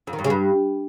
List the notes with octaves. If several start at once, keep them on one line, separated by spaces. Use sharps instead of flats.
F2
D#3
G2
C#3
G2